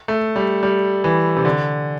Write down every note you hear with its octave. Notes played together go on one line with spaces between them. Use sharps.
A3
G3
G3
E3
C3
D3